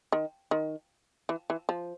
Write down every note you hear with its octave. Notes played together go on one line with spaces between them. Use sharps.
D#3
D#3
E3
E3
F3